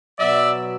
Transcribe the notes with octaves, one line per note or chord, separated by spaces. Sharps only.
B2 F#3 B3 D5 E5